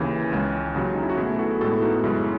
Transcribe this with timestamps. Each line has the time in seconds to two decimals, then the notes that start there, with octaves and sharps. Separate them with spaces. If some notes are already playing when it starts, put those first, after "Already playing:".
Already playing: D#2 C#3 E3
0.32 C#2 C#3 G#3
0.74 D#2 C#3 F#3
0.95 D#4
1.03 E4
1.10 F#4
1.17 B2 A3 E4 G#4
1.39 F#4 A4
1.61 A2 G#3 B3 F#4 A4
1.73 E4
1.82 D#4 F#4
2.04 F#2 C#3 G#3 E4